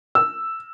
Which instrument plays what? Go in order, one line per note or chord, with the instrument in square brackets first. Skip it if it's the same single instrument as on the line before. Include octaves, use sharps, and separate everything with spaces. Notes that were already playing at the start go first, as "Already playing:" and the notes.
[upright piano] E6